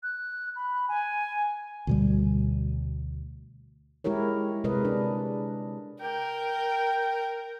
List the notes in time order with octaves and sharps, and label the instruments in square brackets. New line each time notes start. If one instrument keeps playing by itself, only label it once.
[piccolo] F#6
B5
G#5
[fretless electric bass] D2 B2 G3
[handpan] G#3 E4 G4 A#4 C#5
C3 G#3 A#4 B4 D#5
D4
[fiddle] A#4 [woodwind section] G5